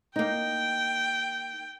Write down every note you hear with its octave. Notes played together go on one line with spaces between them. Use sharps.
A#3 D#4 G5